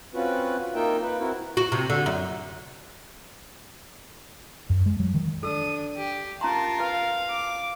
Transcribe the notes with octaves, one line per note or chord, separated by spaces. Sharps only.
C4 C#4 F4 F#4 B4
A#3 D#4 F4 A#4 E5 G5
B4
C4 E4 F#4 A#4
F#4
C3
D3
F#2
F#2
G#3
F#3
D#3
D4 A4 D#6 E6
G4
C#4 F4 A#4 A5 A#5 C6
B4 F5
D6